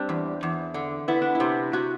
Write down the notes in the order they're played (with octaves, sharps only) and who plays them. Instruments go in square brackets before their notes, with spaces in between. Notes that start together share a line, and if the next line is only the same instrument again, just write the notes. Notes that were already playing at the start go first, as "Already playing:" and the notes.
Already playing: [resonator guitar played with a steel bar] G3 [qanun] C4 D4
[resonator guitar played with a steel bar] E2
E2
D3
[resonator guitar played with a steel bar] B3 [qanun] E4
[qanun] D4
E4
[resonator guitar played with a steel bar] C3
[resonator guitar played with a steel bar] C3 [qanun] F#4